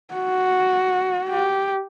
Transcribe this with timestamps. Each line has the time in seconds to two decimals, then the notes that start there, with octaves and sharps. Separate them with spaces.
0.14 F#4
1.30 G4